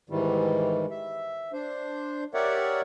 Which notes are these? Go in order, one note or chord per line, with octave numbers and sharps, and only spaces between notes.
G#2 D#3 E3 G3
E5
D4 C5
G4 A#4 C#5 D5 E5 F#5